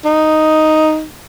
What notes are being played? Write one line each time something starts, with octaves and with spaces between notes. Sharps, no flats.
D#4